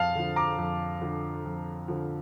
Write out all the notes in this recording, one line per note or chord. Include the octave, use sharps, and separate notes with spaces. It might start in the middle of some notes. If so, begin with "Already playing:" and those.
Already playing: F2 F5 A5
D3 F3
A#5 D6
F2
D3 F3
F2
D3 F3